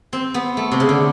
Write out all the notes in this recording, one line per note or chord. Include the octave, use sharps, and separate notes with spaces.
C4
B3
A3
C3
C#3
D3